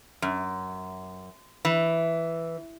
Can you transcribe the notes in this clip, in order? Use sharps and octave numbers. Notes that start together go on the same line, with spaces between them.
F#2
E3